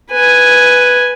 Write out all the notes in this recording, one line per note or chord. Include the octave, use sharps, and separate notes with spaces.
B4 G#5